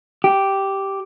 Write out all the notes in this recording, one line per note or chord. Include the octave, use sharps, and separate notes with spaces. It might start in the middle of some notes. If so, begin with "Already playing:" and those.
G4